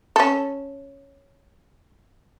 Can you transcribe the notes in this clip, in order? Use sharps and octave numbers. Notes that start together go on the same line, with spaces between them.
C#4 A4